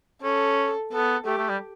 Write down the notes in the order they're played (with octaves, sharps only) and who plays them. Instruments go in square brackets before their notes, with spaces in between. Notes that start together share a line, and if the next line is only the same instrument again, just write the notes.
[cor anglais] C#4 [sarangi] A4
[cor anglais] B3 [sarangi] A4
[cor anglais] A3 [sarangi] G4
[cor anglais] A3
G3